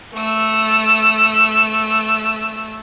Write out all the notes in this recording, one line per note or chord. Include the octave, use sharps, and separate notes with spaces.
A3 E6